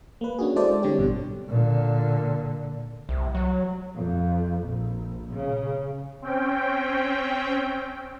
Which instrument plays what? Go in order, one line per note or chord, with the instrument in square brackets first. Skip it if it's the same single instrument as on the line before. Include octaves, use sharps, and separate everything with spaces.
[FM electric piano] A#3 B4
C#4 D4 F#4 G#4
G#3 E4 A4 C5 D5
D3 G3 C4 D4 G4 C#5
A1 G2 B2 G3
[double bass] A#2 D3
[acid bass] C2
F#3
[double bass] F2
A#1
C#3
[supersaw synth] C4 C#4 G5